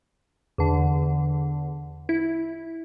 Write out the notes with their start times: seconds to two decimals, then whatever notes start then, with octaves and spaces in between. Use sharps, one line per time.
0.58 E2 D3
2.09 E4